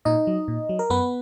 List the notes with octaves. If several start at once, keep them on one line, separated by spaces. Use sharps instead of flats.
A#2 D#4 D#5
F#3
A#2
F#3
A#4
F#2 B3 B4